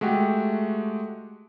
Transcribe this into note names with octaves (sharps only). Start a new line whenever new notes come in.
G#3 A3 F#4 G4